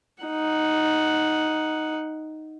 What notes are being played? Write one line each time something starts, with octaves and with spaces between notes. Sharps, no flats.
D#4 F#5